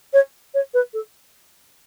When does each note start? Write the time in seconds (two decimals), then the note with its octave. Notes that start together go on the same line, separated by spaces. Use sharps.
0.13 C#5
0.54 C#5
0.73 B4
0.93 A4